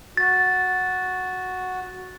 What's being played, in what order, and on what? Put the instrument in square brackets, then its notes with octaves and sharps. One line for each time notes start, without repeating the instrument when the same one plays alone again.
[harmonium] F#4 [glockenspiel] A6